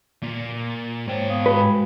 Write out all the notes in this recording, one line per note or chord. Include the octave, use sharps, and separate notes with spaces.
A#2
G#2 C5 C#5 G5
B3 F5 D#6
G#3 F#4 B4 B5